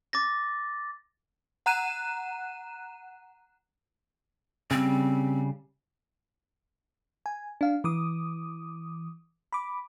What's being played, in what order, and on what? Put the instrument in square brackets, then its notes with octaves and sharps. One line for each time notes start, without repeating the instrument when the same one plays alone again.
[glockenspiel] D6 A6 A#6
[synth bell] F#5 A#5 F#6 D#7 E7
[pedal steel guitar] C#3 G3 [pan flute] C4
[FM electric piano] G#5
D4 F5
E3 D6 D#6
B5 D6